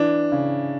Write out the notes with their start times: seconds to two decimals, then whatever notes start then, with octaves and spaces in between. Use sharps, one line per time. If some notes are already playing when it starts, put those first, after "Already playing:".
Already playing: E3 D4
0.32 C#3